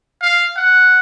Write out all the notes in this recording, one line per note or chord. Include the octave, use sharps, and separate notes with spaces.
F5
F#5